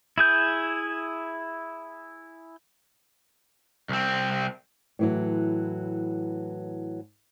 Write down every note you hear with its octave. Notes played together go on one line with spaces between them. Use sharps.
E4 G#4 G6
C2 C4
A2 E3 F#3